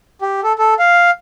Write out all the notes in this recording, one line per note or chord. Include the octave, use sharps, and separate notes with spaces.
G4
A4
A4
F5